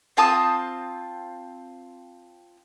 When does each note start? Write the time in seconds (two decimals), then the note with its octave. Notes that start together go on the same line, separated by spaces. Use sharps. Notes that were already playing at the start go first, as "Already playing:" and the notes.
0.17 C4 F4 A5 D#6